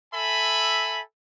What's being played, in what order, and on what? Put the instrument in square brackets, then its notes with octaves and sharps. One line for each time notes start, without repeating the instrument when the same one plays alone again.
[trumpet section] A4 E5 G#5 B5